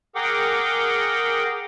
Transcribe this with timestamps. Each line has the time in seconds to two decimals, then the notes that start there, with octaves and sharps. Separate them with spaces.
0.15 G#4 A#4 F#5 G5 D6